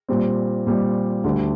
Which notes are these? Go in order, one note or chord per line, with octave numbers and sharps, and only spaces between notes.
A#2 G3 C4
A#2 G3 C4
D2 D3 G3